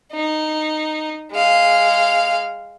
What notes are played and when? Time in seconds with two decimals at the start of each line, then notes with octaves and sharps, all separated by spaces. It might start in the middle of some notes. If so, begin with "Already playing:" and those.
0.13 D#4
1.32 G#3 F5